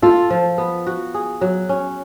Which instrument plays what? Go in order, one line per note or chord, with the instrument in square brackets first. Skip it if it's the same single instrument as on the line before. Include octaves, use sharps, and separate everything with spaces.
[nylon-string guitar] F4 [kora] A4
[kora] F3
B3
F#4
G#4
F#3
C#4